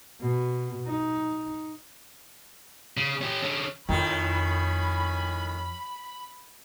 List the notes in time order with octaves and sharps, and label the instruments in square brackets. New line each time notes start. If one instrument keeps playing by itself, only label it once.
[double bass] B2
D#4
[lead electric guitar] C#3
C#4 G4
D3 C#4
[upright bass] F2 [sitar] A2 D#3 [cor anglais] C#4 [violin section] B5